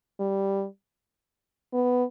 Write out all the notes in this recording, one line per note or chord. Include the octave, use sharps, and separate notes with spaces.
G3
B3